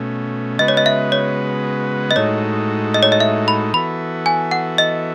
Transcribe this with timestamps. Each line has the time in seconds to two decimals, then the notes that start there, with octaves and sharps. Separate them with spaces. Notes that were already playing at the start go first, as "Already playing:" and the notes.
Already playing: B2 A3 C#4
0.59 C#3 G#3 B3 F#4 B4 D#5
0.68 C#5
0.77 D#5
0.86 E5
1.12 C#5
2.11 D#5
2.16 A2 G#3 D#4 F#4 A4 C#5
2.94 D#5
3.03 C#5
3.12 D#5
3.20 E5
3.48 B5
3.74 E3 B3 F#4 A4 E5 B5
4.26 G#5
4.51 F#5
4.78 D#5